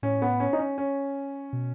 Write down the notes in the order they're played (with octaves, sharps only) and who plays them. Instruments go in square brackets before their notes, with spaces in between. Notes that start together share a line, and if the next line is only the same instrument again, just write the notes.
[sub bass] A2 [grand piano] C#4
[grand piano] B3
C#4
D#4
C#4
C#4
[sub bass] B2